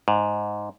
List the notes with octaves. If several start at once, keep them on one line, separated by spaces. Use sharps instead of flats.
G#2